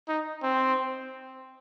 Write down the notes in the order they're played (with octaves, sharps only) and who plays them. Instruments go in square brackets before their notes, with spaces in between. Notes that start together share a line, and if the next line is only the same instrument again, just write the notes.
[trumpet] D#4
C4